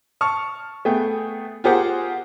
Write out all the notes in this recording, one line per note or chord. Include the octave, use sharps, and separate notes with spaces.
A5 C#6 F6
A3 B3 G#4 G5
F4 G4 G#4 A#4 C5 F#5